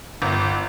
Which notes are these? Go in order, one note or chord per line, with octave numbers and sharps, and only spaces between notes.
G1